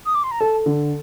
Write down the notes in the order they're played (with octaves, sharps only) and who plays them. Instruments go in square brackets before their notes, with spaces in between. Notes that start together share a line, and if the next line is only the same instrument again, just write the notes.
[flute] D#6
D6
C6
A#5
[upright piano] A4 [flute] A5
[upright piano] D3